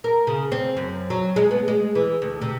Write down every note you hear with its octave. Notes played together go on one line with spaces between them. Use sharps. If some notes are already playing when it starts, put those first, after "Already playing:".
A#4
C#3
C4
F#2
F#3
G#3
B3
G#3
E3
D2
C3